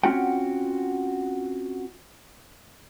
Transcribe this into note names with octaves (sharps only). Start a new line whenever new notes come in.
C4 C#4 F4 F#4 F#5 G5